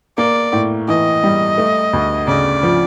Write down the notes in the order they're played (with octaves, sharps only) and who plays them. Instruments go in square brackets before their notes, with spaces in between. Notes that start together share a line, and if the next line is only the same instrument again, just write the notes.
[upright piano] A#3 [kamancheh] D5
[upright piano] A2
[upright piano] E3 [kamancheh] D#5
[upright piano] G3
A3
D2
[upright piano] C#3 [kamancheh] D5
[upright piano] F3